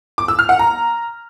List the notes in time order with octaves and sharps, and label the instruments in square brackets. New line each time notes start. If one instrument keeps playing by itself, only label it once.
[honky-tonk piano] D6
E6
F6
F#5
A#5